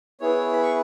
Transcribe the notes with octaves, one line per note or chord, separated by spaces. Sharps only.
B3 E4 G#4 C#5
B5
C#6